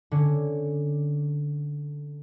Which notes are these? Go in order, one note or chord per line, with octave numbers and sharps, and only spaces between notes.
D3 C#4